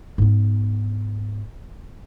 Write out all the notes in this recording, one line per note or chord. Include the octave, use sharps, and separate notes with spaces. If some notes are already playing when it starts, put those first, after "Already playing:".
G#2 B3